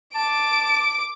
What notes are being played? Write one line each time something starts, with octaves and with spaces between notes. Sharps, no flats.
A5 D6 D7